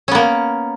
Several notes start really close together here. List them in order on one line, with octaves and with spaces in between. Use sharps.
C#4 B3 A#3